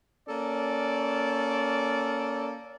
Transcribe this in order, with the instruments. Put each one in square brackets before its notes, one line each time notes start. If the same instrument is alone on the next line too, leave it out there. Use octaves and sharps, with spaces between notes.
[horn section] A#3 C#4 A4 D5